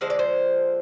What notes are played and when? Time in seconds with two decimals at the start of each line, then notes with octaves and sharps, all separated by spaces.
0.01 D3 F3 G#3 C5
0.10 D5
0.19 C5